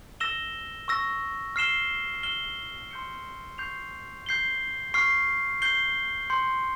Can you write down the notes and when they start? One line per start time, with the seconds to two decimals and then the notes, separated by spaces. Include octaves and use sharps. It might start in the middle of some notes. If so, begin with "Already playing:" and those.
0.20 E6 A#6 E7 G7
0.88 C#6 E6 A#6
1.56 F6 C7 E7 G7
2.23 F6 C7 E7 G7
2.91 C6 G6 C#7
3.58 C#6 G6 C7 F7
4.26 G6 C7 G7
4.94 C#6 F6 C7
5.62 G6 C7 G7
6.30 C6 G6 C#7